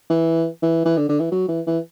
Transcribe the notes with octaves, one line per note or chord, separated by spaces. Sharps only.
E3
E3
E3
D3
D3
E3
F#3
E3
E3